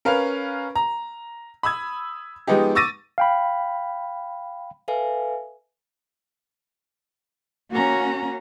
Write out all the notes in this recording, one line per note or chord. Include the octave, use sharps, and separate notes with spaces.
C#4 A#4 B4 F5 F7
A#5
B5 D#6 E6 G#6
F3 G#3 B3 D#4 G4
C#6 D6 E6 A6 A#6 D#7
F5 G5 B5
A4 B4 E5 F5 G#5
A#3 C#4 F#4 A#5